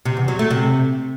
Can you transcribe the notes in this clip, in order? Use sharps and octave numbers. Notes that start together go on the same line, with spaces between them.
C3
E2
F#3
A3
C3